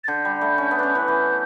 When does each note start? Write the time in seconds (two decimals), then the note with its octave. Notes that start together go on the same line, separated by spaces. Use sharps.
0.04 A6
0.08 D3 G6
0.25 G3
0.41 A3
0.58 C#4
0.71 B3
0.79 C#4 D4
0.95 E3 F#6
1.08 E3 G6